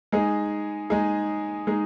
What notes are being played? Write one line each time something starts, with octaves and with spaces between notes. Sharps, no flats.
G#3 D#4 G#4
G#3 D#4 G#4
G#3 D#4 G#4